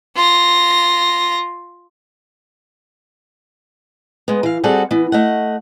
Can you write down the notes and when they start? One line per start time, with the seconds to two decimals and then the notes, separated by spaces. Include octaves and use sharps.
0.16 F4 A#6
4.28 G#3 B3
4.43 E3 F5
4.63 G3 C4 F#4 G#4 A4 F#5
4.91 E3 B3
5.12 A3 D#5 F#5